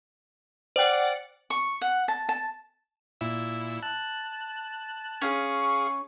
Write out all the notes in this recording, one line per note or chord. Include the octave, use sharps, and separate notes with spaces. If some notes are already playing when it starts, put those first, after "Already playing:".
C5 D5 F#5 G5
C#6
F#5
A5
A5
A#2 E4 E6
A5 F#6
C#4 G#4 F5 C#6